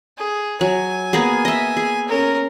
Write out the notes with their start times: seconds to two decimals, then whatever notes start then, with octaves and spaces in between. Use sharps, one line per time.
0.18 G#4
0.61 F#3 G#5
1.13 A#3 B3 G#4
1.45 D#5 E5
1.77 G#4
2.08 C#4 A#4